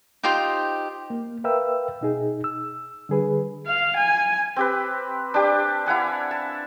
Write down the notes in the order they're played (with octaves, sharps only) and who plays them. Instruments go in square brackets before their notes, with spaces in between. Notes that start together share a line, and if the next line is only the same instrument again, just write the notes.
[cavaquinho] D#4 F4 G4 C5
[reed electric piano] A#3
A#4 B4 E5 F5 G5 E6
B2 D#4 G#4
E6
D3 G3 G#4 B4
[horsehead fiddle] F5
G#5
[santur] C4 G4 B4
D4 G4
E4 F5 F#5 G#5
A5